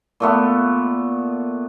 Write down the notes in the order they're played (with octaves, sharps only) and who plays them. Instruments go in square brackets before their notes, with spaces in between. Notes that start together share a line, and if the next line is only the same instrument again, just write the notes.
[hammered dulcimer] A#2 A3 B3